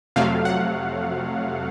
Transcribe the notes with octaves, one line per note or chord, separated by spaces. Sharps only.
F2 C3 F#3 A3 F5
F#5